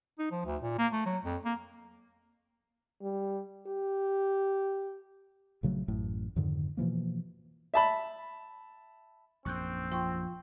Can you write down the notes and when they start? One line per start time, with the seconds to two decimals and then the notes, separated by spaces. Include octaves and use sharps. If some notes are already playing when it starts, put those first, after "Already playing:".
0.19 D#4
0.32 F3
0.45 D2
0.62 A#2
0.78 A#3
0.92 A3
1.06 F#3
1.25 F2
1.45 A#3
3.02 G3
3.67 G4
5.63 A#1 C#3 F#3 A3
5.88 A1 F#2 A2
6.36 F2 G#2 D3 D#3
6.77 B2 E3 F3 A#3
7.74 E5 A5 B5
9.45 A#1 F#2 C4 C#6 F#6 G6
9.92 F3 F4 G5 C6 C#6